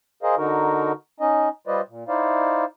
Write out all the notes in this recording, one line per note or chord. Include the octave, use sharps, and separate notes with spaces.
G#4 A#4 C5 D#5 F5
D3 D#4 F#4 A#4
C#4 D#4 D#5
G3 F4 B4 C5 D5 D#5
A#2
D#4 E4 C5 D5 F5